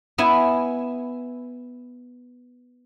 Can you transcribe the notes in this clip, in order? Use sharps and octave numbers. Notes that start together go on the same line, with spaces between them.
B3 E4 G#5